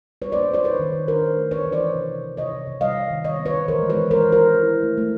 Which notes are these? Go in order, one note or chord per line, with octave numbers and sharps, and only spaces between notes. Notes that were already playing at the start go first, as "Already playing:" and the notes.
G3 B4 C#5
C5 D5
A#3
A#3 C5 D5
D#4 B4 C#5
D#3
D#3
D4 A#4 C5
D4
A3
E3 B4 C#5
E3
C5 D5
E3
C3
C3
C3
C3 C#5 D#5
C3
C3
G3 D#5 F5
D#3
D#3
C3 C#5 D#5
B3
B4 C#5
D#3
E3 A#4 C5
G#3
B4 C#5
E3
E3 A#4 C5
E3
A#4 C5
E3
E4
E4
A3
A3